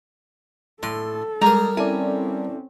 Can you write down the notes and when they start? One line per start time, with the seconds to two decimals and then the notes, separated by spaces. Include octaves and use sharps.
0.83 A2 A4 C6
1.42 G3 G#3 G#4 A#4 A#5
1.77 C4 C#4 E4 A4 D5 G#5